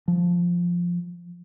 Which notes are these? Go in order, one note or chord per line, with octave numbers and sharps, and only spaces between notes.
F3